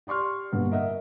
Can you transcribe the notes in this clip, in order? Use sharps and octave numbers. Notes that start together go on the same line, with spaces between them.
G4 D5 C6 C#6 F6
G2 B2 D3 A#3
A#4 D#5 E5 F#5